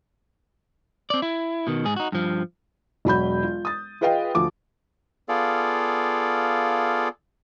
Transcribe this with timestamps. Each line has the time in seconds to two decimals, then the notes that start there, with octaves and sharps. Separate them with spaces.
1.10 C4 D5
1.22 E4
1.67 B2 D#3
1.85 G#2 G#4
1.96 D#4 F#4
2.12 G2 F3
3.05 E1 F#3 B5 G6
3.43 F4
3.65 D#6 A6
4.01 F4 G#4 B4 D#5 F5 G5
4.35 D2 F3 D6
5.29 B3 F4 G#4 A4 D5 F5